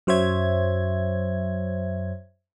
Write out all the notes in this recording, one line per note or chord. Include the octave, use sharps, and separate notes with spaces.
F#2 F#3 C5 C#5 E5 G#6